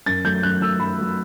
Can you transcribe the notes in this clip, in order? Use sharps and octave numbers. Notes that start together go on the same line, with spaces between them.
F#2 A6
F#3 A3 G6
F#2 F#6
F#3 A3 E6
F#2 B5
F#3 A3